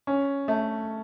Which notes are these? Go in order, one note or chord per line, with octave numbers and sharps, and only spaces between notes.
C#4
A3